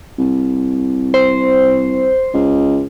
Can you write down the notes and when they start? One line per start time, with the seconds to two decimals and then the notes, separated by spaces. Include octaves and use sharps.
0.18 C2
1.14 C5
2.34 C#2